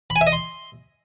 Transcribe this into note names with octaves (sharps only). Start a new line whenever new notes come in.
B5
G#5
E5
D#5
C6